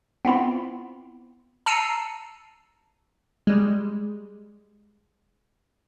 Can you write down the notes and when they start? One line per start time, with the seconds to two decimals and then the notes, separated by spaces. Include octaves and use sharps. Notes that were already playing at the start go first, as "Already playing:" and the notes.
0.25 B3 C4 E4 F4
1.66 A5 A#5 E6 C7 C#7 D#7
3.47 G3 G#3